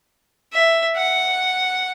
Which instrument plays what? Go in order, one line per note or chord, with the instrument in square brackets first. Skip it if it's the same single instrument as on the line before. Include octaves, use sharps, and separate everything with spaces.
[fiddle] E5
F#5